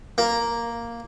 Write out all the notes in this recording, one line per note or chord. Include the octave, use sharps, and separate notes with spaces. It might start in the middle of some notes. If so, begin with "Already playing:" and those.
A#3